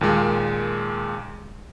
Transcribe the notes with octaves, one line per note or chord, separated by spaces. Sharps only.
D#2 A#2 G#3